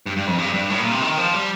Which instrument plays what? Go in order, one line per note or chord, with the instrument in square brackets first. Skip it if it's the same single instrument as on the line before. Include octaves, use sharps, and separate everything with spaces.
[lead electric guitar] G2
G2
F2
G2
G2
A2
A#2
C3
D#3
F3
G3